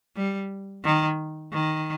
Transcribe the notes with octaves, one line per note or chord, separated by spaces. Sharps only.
G3
D#3
D#3